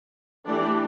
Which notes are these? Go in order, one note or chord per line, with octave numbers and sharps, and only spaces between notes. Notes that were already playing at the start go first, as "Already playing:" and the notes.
E3 A3 D4 G4 D5